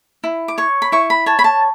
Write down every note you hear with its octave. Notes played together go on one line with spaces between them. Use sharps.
E4
D6
C#5 C#6
B5
E4 C#6
B5
C#5 A5
B5
A5